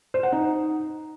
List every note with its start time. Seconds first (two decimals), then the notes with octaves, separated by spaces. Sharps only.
0.14 C5
0.23 F#5
0.32 D#4